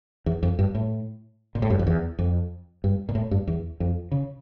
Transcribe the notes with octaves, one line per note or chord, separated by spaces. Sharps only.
E2
F2
G2
A2
A#2
A2
G2
F2
E2
F2
G2
A#2
A2
G2
E2
F2
C#3